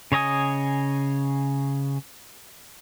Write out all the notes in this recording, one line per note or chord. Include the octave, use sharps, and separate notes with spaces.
C#3 C#5 D#5 G#5 D#6